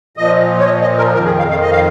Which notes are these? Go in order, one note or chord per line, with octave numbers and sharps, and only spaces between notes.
A#2 F3 D#5
C#5
D#5
D#5
A#4
F2 D#3 A#4
G#4
F5
F5
D#5
F5